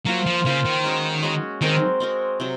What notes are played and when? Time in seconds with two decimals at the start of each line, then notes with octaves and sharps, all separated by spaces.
0.05 F#3 A#3 F4 C5
0.26 F3
0.45 C#3 A#3 F4 C5
0.65 D#3
0.84 G#3 C#4 F#4
1.23 G#3 C#4 F#4
1.61 D#3 G#3 C4 F#4 A#4
2.00 G#3 C4 F#4 A#4
2.40 C3 F#3